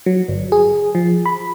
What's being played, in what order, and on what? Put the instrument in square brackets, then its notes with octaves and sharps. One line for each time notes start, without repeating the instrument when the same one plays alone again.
[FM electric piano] F#3
G1
G#4
F3
B5